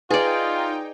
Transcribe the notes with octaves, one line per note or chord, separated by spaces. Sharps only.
D#4 F4 G#4 B4 D5 G5